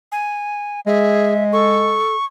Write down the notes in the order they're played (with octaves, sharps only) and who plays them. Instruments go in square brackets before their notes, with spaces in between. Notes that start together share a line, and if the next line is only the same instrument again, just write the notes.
[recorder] G#5
[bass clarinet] G#3 [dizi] G#4 [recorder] E5
[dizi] A4 [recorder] C#6